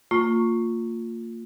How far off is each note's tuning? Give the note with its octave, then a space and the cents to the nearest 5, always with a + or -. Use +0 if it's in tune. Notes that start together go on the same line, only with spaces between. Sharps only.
A#3 -35 F4 +10 C#6 +0